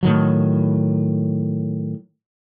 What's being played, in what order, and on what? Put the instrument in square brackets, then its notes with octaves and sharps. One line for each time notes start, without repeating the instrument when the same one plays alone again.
[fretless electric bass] A2 D#3 F#3